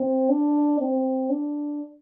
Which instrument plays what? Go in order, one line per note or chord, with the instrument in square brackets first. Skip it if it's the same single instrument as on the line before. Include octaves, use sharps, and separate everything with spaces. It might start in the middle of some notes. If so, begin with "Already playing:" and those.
Already playing: [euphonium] C4
D4
C4
D4